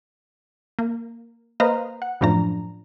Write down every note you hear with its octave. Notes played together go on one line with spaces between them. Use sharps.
A#3
A#3 B4 C5 D#5 F5 A#5
F#5
F#2 A2 F3 D4 A#5